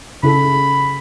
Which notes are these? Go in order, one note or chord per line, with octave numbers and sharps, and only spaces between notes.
C#3 E4 A4 B5